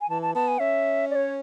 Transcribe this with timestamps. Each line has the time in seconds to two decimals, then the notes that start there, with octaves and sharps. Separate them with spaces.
0.01 G#5
0.09 E3 A5
0.22 A5
0.35 B3 A5
0.48 G#5
0.60 C#4 E5
1.10 D5
1.15 C#5